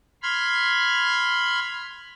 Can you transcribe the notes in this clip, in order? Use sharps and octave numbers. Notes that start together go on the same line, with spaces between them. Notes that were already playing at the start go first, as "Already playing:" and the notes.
B5 C6 F6 G#6